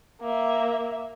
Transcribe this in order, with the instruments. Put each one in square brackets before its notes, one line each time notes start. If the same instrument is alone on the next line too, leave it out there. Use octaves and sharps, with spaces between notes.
[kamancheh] A#3 E5